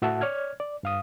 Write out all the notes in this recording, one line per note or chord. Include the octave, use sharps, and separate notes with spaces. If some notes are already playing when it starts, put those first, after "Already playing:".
A2 F#4 E5 F#5 A5
C#5 D5 F6 G#6
D5
G2 F5 D#6